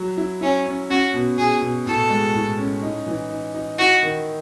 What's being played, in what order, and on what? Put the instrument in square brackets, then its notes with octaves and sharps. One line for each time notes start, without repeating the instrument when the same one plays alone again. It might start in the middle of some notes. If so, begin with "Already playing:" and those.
Already playing: [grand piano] F#3
E4
[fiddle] C#4 [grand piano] E4
[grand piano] C#4
[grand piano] C#4 [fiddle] F#4
[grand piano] B2
[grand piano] B2 [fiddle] G#4
[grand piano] B2
[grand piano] A2 [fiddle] A4
[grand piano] G#3
A2
C#4
D#4
E3
D#4
D#4
[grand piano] E4 [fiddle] F#4
[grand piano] D#3